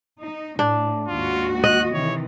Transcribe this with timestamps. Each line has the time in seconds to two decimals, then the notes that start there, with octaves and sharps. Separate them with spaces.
0.20 D#4
0.59 A2 D4
1.08 D#2 G#2 F4 F#4
1.64 D#5 F#6
1.93 C3 D#3 E3 C#5